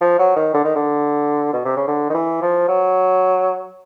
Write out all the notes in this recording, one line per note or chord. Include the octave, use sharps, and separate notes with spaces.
F3
F#3
D#3
D3
D#3
D3
B2
C3
C#3
D3
D#3
E3
F3
F#3